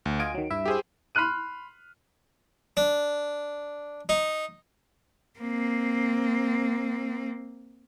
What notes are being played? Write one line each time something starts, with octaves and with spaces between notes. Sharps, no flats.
D2
F4 D#5 G#5 D7
D#3 F#3
G2 E4 E5
G4 G#4 C5
B5 C6 F6 F#6 D#7
D4
D#4
A#3 C4